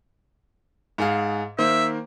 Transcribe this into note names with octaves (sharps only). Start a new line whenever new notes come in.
G#2 G#4 F5
D#3 A#3 C5 E5